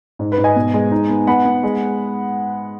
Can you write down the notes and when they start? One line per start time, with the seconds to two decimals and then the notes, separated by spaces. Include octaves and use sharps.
0.19 G#2
0.32 B4
0.38 G#2
0.44 D#5 G#5
0.56 B2
0.74 G#3
0.91 D#4
1.09 B3
1.27 B3 F#5 B5
1.45 B3
1.63 G#3